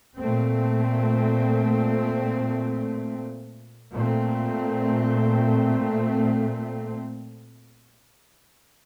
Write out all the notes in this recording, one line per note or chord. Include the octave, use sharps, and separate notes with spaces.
A#2 A3 C4
A#2 A3 C4